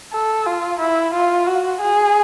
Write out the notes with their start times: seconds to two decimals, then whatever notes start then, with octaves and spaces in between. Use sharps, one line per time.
0.13 A4
0.46 F4
0.80 E4
1.14 F4
1.47 F#4
1.81 G#4